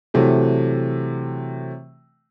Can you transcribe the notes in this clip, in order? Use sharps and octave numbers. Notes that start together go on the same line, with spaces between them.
C3 E3 F#3 A3